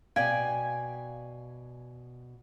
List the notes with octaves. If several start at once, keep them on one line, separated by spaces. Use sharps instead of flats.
B2 D5 F5 G5 G#5